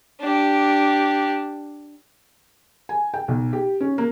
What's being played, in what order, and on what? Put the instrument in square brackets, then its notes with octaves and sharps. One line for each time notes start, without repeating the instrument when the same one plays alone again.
[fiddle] D4 G4
[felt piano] G#5
G5
B1
G4
C#4
A#3